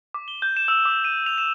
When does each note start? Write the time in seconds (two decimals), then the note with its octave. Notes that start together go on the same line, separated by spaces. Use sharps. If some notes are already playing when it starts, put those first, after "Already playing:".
0.14 D6
0.28 G7
0.42 G6
0.57 E7
0.68 E6
0.85 D6
1.04 D#7
1.26 F7
1.38 E7